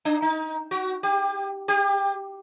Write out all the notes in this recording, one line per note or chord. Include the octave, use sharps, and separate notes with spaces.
D4
D#4
F#4
G4
G4